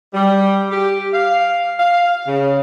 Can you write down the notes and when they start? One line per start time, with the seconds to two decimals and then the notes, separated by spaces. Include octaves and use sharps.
0.14 G3
0.71 G4
1.13 F5
1.79 F5
2.27 C#3